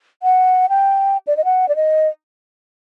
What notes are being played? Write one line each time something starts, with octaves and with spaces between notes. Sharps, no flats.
F#5
G5
D5
D#5
F#5
D5
D#5